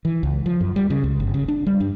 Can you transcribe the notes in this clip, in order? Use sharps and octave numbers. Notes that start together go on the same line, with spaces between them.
E3
C#2
F3
F#2
G3
C#3
C#2
G1
C#3
D4
G3
G2